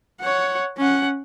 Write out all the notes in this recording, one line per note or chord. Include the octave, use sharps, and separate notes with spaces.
C#5 F#5
C#4 F#5